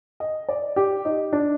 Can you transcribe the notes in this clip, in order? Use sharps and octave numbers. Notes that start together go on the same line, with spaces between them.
D#5
D5
G4
D#4
D4